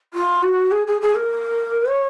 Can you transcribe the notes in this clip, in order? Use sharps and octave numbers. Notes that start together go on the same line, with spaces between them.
F4
F#4
G#4
G#4
G#4
A#4
C#5